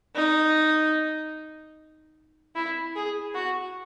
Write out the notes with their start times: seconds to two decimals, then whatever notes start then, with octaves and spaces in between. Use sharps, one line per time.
0.15 D#4
2.55 E4
2.95 G#4
3.34 F#4